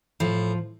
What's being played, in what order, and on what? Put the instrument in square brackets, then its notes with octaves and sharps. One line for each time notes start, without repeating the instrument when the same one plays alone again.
[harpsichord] A2 [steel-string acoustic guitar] F3